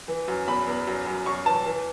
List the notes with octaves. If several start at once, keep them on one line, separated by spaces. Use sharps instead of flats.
E3
F#2
E2 B5
E2
F#2
F#2
F#2 C#6
E3 A5
E3